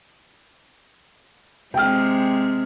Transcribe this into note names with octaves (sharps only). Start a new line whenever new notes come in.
C3 G#3 G5 F6